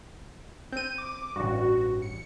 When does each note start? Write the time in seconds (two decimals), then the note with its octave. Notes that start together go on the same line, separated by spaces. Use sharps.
0.72 C4 G6 D#7
0.98 D6
1.36 A1 G2 F#4
2.02 C#7